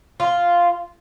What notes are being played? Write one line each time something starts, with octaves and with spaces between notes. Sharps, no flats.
F4